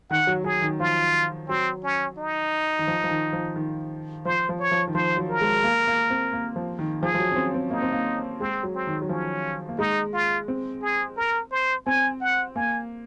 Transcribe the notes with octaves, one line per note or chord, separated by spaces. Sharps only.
D#3 F#5
F#3
F#3 G#4
D#3
F3 F4
F#3 C4
C#4
D#4
D#3
F3
F3
D#3
F3
D#3
F3 C5
F3
C#5
F3
D#3
F3 C5
F#3
A#4
G#3
A#3
A#3
C4
A#3
F3
D#3
F3 G#4
F3
F#3
C#4
C4
C4
A#3 D#4
C4
A#3
G#3 C4
F#3
C4
D#3
F#3
F3 C#4
A#3
G#3 D#4
F4
C4
G#4
A#4
C5
C4 G#5
F#5
A#3 G#5